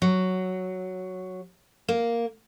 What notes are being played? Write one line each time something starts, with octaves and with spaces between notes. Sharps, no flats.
F#3
A#3